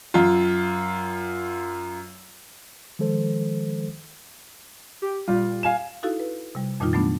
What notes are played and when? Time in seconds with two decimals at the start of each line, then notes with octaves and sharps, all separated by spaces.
0.14 F#2 F4
2.99 D#3 F3 G#3 A4 C5
5.02 G4
5.28 A#2 G3 F4
5.63 F5 G#5 E7
6.03 D#4 E4 F#4 A4 F5
6.20 B4
6.55 C3 G3
6.80 F2 A#2 D#3 G3 D#4 F4
6.93 F#3 A3 B3 D4